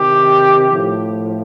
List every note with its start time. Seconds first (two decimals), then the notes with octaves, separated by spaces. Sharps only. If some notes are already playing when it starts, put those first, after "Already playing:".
Already playing: C3 D#3 G4
0.70 A2 F3